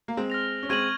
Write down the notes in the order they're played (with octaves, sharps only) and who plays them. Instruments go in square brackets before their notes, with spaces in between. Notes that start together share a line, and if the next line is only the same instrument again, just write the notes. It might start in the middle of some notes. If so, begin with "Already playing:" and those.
[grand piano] A#3
G#3 C4
[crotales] F6 A#6 F7
[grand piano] C#4
[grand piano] G#3 C4 [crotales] C#6 G#6 D#7 F#7